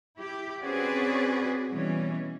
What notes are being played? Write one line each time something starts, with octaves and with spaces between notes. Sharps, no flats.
E4 G4
C4 C#4 F#4 G#4 B4 D5
B2 E3 G3 C#4